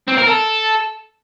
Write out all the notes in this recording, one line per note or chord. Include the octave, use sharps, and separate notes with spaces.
C4
A#4
A4